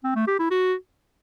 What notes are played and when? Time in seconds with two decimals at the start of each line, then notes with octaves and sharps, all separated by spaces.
0.04 C4
0.16 A3
0.27 G4
0.39 E4
0.51 F#4